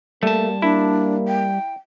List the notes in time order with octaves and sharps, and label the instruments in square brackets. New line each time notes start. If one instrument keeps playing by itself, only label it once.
[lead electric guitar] G3 A5 [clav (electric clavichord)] A3 [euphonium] A#3
[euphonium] A#3 [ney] D4 [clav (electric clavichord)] E4
[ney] G5